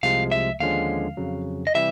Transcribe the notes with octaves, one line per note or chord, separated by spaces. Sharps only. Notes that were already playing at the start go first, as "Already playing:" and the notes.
C2 C3 F3 G#3 F5
E5
D#2 D3 F3 G#3 C#4 F5
F2 C#3 F#3
D#5
C3 E3 G3 E5